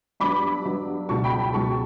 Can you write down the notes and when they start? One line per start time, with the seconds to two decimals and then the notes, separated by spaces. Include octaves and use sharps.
0.20 G2 F#3 B3 D4 B5 D6
0.65 G2 F#3 B3 D4
1.09 C#2 B2 F#3 A5 C#6
1.24 G5 B5
1.39 G5 B5
1.53 C#2 B2 F#3 A5 C#6